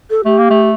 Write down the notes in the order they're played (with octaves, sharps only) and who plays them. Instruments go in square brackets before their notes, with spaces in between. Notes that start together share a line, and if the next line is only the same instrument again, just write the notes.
[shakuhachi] A4
[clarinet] A3 [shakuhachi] G4
[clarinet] A#3
A3